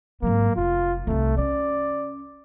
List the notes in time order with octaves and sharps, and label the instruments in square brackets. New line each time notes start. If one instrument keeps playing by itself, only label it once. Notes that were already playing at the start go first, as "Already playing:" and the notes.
[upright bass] G#1 F#3 [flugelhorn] A#3
[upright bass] F1 [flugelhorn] F4
[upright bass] C2 D#4 [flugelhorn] A3
[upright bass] C#4 [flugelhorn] D5